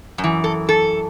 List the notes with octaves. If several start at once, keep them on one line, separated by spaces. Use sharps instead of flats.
F#2
E3
A4
A4